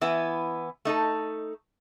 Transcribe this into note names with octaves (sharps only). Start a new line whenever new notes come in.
E3 B3 E4 B4
A3 D#4 A4